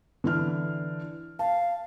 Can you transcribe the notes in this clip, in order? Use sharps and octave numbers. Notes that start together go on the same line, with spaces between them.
D3 E3 F6
F5 A5